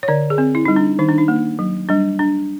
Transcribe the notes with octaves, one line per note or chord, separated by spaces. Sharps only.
C#5
D3 D5
G#4
C4
E4
G3 D#4
D4
D#3 D#4
D4
D#4
A#3
F#3
G3 D4
D4